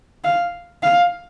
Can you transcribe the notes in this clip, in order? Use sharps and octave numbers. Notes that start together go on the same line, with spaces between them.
F5
F5